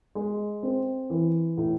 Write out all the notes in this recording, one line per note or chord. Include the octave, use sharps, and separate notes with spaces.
G#3
C4
E3
A2